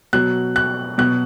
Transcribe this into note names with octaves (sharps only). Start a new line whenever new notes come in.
B2 F#3 F#6
F#6
B2 F#3 F#6